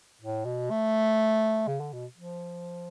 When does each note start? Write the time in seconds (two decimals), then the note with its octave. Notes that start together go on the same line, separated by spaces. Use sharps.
0.21 A2
0.45 B2
0.71 A3
1.68 C#3
1.80 D3
1.93 B2
2.17 F3